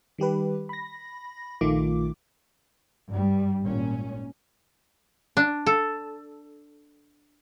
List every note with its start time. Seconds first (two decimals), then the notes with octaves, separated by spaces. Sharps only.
0.18 D#3 G3 G4 B4
0.69 B5 A#6
1.61 A#1 D#3 A3 F4 D6
3.11 G2 G3
3.62 G#1 A#2 C#4
5.37 D4
5.66 A4